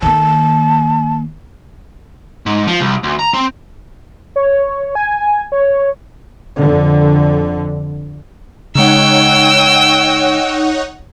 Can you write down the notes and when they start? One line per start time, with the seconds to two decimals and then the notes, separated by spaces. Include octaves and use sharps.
0.02 D#3 A#3 A5
2.46 G#2
2.68 F3
2.81 C2
3.04 D2
3.19 A#5
3.34 C4
4.36 C#5
4.95 G#5
5.52 C#5
6.58 F2 D3
8.75 C#3 G#3 D#4 C#5 F#5 G5 E6